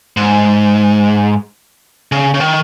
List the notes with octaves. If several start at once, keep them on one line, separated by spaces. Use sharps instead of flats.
G#2
C#3
C#3
D#3